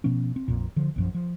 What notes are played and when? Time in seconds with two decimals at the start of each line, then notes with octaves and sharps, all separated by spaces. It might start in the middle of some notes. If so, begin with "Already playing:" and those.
0.04 B2 F3 B3 C#4
0.36 C4
0.48 A#1 F2 A#2
0.76 D3 F3
0.96 A#1 F#2 F3
1.15 F3